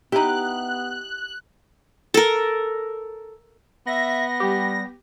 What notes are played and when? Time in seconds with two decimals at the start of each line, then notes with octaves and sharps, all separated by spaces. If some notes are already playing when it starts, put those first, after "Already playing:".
0.12 B3 D#4 E4 G4 F#6
2.14 A4 A#4
3.87 B3 E5 A#6
4.40 G3 G4